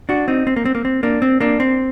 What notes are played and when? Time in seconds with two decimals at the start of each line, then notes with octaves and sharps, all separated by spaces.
0.09 D4 F#4
0.28 C4 D#4
0.47 C4
0.56 A#3
0.65 C4
0.75 A#3
0.85 C4
1.03 A#3 D4
1.22 C4
1.40 A#3 D4
1.60 C4